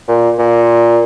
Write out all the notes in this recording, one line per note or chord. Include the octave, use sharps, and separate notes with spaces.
A#2
A#2